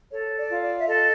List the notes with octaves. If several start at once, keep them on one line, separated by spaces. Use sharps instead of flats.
A4 C#5
D5
F4
D5
E5
A4 D#5